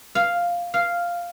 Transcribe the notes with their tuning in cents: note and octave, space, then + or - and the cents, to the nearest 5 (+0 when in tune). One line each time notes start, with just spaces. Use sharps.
F5 +0
F5 -5